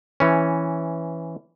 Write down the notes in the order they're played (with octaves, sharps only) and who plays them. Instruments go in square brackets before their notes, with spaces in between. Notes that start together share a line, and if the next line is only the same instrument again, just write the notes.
[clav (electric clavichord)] E3 C#4